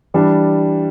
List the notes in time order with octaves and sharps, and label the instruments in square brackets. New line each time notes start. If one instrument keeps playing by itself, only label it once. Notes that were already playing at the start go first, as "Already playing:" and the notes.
[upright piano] E3 G3 D4